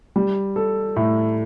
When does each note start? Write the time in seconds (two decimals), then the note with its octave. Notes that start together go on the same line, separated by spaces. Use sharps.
0.16 G3
0.56 A4
0.96 A2